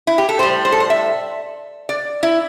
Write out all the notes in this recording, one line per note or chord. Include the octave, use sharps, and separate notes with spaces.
E4
G4
A4
A2 G3 C5
C5
A4
C5
E5
D5
E4